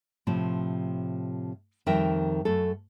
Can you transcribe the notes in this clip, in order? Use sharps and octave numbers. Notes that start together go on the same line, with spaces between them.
A2 C3 F3
F2 D#3 G3 A#4 E5 G5
F#2 A3 A4